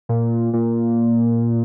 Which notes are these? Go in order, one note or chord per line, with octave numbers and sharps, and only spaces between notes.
A#2
A#2